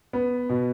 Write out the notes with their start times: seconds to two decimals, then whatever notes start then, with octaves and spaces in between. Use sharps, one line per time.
0.13 B3
0.49 B2